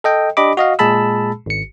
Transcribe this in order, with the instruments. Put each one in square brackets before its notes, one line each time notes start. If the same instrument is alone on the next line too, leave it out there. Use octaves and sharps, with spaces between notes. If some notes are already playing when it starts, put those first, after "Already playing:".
[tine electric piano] A4 D#5 G5
D4 G4 D#5 B5 D6
F#4 D#5 F5
A#2 G#3 G#4 A5 B5 E6
G#1 C#7